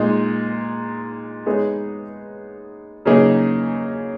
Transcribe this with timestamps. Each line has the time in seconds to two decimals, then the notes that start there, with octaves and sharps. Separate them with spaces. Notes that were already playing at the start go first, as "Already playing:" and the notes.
Already playing: A#2 G#3 D#4
1.46 G#3 B3 D#4 G#4 C#5
3.05 C#3 F#3 A#3 D#4 G#4